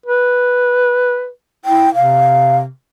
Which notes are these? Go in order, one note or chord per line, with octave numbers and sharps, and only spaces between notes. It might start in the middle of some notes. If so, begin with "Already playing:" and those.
B4
E4 G5
C3 F5